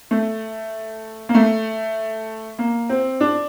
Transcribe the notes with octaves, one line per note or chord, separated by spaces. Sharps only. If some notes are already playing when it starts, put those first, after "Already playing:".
A3
A#3
A3
A#3
C4
D4